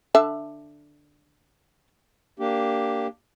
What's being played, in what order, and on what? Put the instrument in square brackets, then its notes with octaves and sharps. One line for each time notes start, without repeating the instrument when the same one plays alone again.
[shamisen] D3 E5 A5
[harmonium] A#3 D4 G4